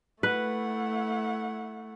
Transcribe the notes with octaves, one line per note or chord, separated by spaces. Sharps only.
A3 E4 B4 F#5